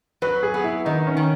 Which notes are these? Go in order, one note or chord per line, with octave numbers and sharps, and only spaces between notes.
F#3 B4
G#4
B3
E4
D#3 D#4
C#4
D#3